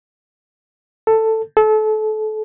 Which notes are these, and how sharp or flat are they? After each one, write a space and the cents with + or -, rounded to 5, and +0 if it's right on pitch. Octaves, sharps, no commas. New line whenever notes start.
A4 +10
A4 -30